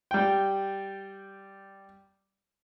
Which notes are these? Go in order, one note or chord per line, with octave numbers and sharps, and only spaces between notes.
G3 G5